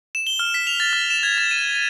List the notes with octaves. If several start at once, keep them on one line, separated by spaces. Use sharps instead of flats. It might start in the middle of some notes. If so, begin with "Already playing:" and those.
E7
G7
F6
B6
F7
A6
F6
E7
G#6
A6
D#7
D#7